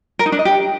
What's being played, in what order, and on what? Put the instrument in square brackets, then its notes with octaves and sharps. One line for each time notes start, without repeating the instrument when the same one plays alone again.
[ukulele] A#4
D#4
D4
D#5
G4